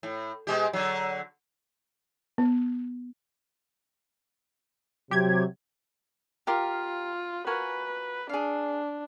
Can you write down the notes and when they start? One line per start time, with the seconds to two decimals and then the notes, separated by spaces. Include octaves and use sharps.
0.03 A2
0.47 B2 G#3 G4
0.73 D3 F#3
2.38 B3
5.11 C3 F#3 G4 G#6
6.47 F4 G4 A#4 F5
7.47 F#4 A#4 B4 G#5
8.29 D4 G#4 F5